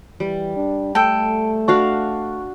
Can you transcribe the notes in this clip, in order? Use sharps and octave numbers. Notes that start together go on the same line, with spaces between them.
E3 G3
D4
A3 A4 G5 A5 D7
D4 F#4 F5 C#6